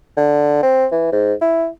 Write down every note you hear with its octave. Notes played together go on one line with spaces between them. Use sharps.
D3
C4
E3
G#2
E4